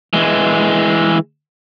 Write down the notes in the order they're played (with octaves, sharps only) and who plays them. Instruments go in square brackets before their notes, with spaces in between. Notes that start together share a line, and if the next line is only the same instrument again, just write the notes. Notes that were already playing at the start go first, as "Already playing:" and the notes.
[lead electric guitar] E3 G#3